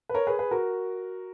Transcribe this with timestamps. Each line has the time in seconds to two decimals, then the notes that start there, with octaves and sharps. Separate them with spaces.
0.09 B4
0.14 A#4 C#5
0.27 G#4 B4
0.39 G#4 B4
0.51 F#4 A#4